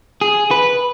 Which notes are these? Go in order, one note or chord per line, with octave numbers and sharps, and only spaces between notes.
G#4
B4